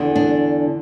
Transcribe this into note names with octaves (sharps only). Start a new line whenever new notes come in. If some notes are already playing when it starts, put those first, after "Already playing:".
Already playing: E2 D3
D4